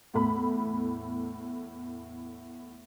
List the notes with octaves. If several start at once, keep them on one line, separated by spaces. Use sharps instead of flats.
E2 A2 A4 B5